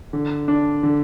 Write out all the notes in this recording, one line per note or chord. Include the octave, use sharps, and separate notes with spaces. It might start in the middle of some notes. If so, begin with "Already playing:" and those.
D3
D4
D3